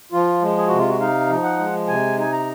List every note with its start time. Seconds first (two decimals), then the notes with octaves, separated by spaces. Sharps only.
0.12 F3 F4
0.42 G#3
0.57 G#4
0.68 C3 F#4
0.78 F4
0.89 F#4
1.00 D#4 F5
1.29 F3
1.44 F#5
1.58 G#3
1.87 C3 G#5
2.17 D#4 G#5
2.32 A#5